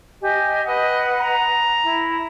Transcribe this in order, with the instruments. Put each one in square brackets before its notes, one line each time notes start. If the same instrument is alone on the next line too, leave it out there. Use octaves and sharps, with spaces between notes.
[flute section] G4 D#5 G#5
[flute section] B4 F#5 [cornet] D#5
[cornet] A#5
[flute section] E4